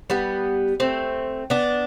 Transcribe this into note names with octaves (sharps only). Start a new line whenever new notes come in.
G3 B3
A3 C4
B3 D4